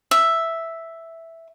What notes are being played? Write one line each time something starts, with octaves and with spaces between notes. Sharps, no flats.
E5